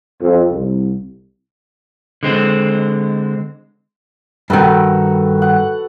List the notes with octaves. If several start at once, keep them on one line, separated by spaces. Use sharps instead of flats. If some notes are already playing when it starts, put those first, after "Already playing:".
F2
C2
D3 G#3 C4
G2 D#3 F#4 A4 B4
F#5